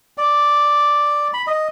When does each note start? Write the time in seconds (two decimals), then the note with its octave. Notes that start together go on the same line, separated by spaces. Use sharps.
0.18 D5
1.34 B5
1.47 D#5